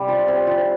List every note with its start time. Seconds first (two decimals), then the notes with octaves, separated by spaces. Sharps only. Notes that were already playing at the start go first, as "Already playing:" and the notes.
Already playing: C3 G3
0.08 F4
0.28 C4
0.47 F4